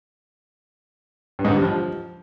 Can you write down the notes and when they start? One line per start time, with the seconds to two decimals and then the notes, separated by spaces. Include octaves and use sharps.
1.39 G2
1.45 G#2
1.50 D3
1.56 G3
1.62 F3